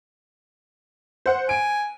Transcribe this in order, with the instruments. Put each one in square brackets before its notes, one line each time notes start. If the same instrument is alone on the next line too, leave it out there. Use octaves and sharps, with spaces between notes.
[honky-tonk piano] C5 F#5
[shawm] G#5 [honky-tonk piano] D7